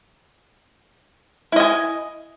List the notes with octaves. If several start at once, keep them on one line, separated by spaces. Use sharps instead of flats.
E4 D#5 G#5